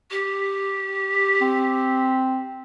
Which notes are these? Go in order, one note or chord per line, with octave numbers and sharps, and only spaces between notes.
G4
C4